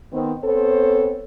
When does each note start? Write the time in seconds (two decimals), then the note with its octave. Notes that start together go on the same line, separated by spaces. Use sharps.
0.12 D#3 B3 C4
0.44 B3 C4 A4 C5 C#5